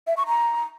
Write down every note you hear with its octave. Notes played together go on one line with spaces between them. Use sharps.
E5
C#6
A#5